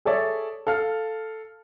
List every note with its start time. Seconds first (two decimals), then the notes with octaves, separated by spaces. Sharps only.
0.05 G#4 A4 C#5 D5 E5
0.67 A4 F5 F6